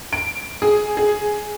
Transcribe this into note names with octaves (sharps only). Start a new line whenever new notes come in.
D7
G#4
G#4